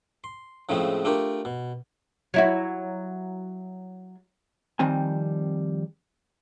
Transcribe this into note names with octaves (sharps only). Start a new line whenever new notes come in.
C6
A2 C#3 F3 G#3 A3 C4
A3 D4 F4 G4 A#4
B2
F#3 E4 F#4
F2 D#3 G3 C4 G#5